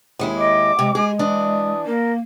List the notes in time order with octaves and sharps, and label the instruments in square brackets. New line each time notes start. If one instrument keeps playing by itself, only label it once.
[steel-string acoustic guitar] D#2 G#3 E4
[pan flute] D#5 [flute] D6
[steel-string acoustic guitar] C3 [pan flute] G#3
[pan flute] G#3 [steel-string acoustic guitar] G#4
[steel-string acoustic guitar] E3 D4 E4 [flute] D#6
[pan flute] A#3 [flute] A#4